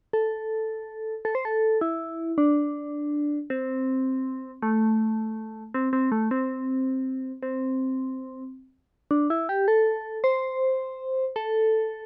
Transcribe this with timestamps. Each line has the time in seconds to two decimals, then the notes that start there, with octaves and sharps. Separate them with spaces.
0.13 A4
1.25 A4
1.35 C5
1.45 A4
1.81 E4
2.38 D4
3.50 C4
4.62 A3
5.74 C4
5.93 C4
6.12 A3
6.31 C4
7.43 C4
9.11 D4
9.30 E4
9.49 G4
9.68 A4
10.24 C5
11.36 A4